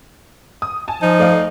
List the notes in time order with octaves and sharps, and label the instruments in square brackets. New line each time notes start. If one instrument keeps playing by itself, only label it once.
[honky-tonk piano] D#6
G#5 A5
[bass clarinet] F3 [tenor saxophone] D#4
[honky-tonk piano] A3 D5 F5